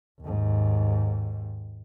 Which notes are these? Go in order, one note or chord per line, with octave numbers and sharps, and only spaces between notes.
D#2 G#2